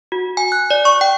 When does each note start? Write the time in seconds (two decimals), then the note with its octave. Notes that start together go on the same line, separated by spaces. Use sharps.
0.12 F#4
0.37 G#5
0.52 F#6
0.71 D5
0.85 C#6
1.01 G5